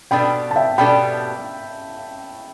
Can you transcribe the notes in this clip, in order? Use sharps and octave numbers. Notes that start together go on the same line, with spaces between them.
B2 G3 B3 D4 A4 G5 B5
A5
E5 G5
B2 G3 B3 D4 A4 G5 B5